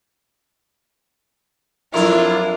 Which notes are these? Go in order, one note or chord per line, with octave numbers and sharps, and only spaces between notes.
F2 F#3 D4 E4 F4 A#4